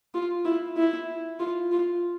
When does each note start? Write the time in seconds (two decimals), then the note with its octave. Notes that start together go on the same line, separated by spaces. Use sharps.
0.15 F4
0.45 E4
0.77 E4
1.40 F4
1.71 F4